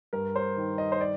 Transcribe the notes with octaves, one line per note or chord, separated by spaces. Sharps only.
G2 A#4
C5
D#3
D#5
C5
D5